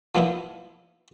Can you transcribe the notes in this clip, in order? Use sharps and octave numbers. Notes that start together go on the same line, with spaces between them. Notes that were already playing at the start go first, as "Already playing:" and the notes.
F3 A#3 B3 D#4 E4